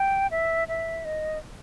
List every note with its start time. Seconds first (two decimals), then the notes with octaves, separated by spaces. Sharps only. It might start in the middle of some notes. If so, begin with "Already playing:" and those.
Already playing: G5
0.31 E5
0.68 E5
1.05 D#5